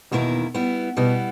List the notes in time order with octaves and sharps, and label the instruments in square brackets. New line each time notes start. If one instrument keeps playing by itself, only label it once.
[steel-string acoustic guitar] E2 D#3 A#3 E4 [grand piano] B2
[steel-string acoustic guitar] G3 B3 E4
[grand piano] B2 [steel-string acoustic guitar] G3 B3 E4